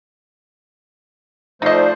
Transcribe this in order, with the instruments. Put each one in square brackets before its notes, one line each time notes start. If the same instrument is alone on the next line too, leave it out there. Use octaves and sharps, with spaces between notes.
[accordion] F3 A3 C5 [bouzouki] D4 F4 [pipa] D#4 D#5